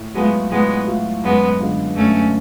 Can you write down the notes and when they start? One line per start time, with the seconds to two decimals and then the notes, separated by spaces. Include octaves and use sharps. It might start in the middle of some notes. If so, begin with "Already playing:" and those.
Already playing: A2
0.15 F#3 G#3 A3 B3 F4
0.51 A2 G#3 B3
0.87 F#3 A3 F4
1.24 F#2 G#3 B3
1.60 D3 G#3 B3 F4
1.96 F#2 A3 C#4